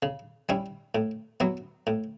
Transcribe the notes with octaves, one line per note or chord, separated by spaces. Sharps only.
C#3
G3 C#4 E4
A2
F#3 B3 E4
A2